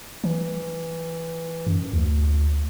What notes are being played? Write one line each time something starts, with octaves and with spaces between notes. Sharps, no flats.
E3
F#2
D2